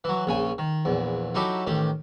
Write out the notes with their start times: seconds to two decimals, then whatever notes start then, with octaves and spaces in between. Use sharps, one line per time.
0.04 E3 F#3
0.27 A#1 C#3 G#5
0.58 D#3
0.85 A#1 E2
1.35 F#3 D#4 E4 G4 A4
1.67 A1 D#3 G4